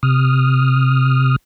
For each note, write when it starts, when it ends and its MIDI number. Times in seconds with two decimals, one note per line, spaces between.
0.03 1.36 48
0.03 1.36 87
0.03 1.36 89